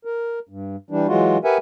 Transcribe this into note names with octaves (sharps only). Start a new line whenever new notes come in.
A#4
G2
E3 G3 D4
E3 F#3 G#3 F4 F#4
G4 A#4 B4 E5 F#5 G#5